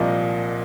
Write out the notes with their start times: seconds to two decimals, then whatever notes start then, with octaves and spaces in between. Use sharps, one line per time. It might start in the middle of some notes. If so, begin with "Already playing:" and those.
Already playing: C2 A#2 F3 A#3 D#5